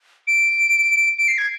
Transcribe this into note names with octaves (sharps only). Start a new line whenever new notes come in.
D7
D7
C7
G#6